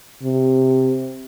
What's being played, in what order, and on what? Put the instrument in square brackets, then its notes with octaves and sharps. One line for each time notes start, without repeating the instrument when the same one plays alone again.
[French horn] C3